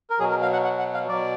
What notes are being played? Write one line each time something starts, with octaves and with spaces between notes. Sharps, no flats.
A#4
B2 F#3 G#4
A#4
F5
F#5
F#5
F#5
F5
B2 F#3 D5